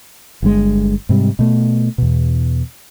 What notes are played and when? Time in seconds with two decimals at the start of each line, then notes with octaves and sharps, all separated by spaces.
0.42 G1 G2 G#3
1.09 G#2 C3 G3
1.39 B2 A3
1.98 E2 B2